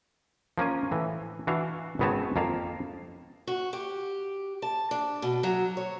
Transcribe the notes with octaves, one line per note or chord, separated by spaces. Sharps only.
F3 A#3 C#4 G#5
A2 E3
E3 D4 F#4 F5
G#1 C#3 B3 C4 C#5 A5
F2 A#3 F5 A5
F#4
G4
A5
D4
B2
F#3
C#5